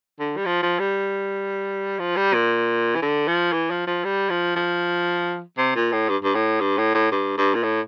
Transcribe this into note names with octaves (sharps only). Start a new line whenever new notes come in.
D3
G3
F3
F3
G3
F3
G3
A#2
E3
D3
F3
E3
F3
F3
G3
F3
F3
C3
A#2
A2
G2
G2
A2
G2
A2
A2
G2
G2
A#2
A2